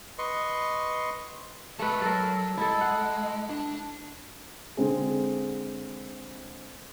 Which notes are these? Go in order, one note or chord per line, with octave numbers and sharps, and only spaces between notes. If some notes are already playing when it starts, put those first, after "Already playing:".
B4 D#5 C6 C#6
G#3 A3 B4 A5
F#3 A4 A#4
G#3 E4 A4
F#5
D4
D3 G#3 C4 G#4